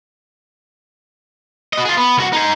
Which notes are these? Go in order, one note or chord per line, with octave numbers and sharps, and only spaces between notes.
F#4 D#5
F4 G#4
B3
C2 F#4
D#4 G#4